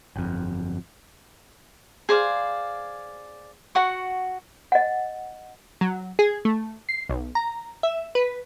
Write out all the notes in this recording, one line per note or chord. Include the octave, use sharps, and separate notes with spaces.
G1 F2
G#4 C5 D5 F5
F#4 F#5 C#6
D#5 F#5
F#3
G#4
A3
C7
B1
A#5
E5
B4